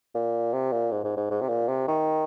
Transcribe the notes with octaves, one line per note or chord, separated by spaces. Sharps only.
A#2
C3
A#2
G#2
G#2
G#2
G#2
C3
A#2
C3
D#3